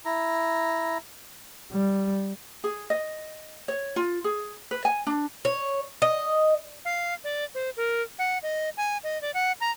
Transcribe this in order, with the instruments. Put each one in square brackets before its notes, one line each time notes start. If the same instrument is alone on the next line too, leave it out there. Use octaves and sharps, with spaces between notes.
[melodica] E4 A#5
[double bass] G3
[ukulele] G#4
D#5
C#5
F4
G#4
B4
G#5
D4
[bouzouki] C#5
D#5
[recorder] F5
D5
C5
A#4
F#5
D#5
G#5
D#5
D5
F#5
A#5